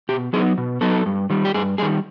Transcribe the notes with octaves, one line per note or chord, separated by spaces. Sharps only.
B2 G4
F#3 B3 D#4 G#4
B2
F#3 B3 D#4 A4
G2
D#3 G3
G4
G2 G#4
D#3 G3 G#4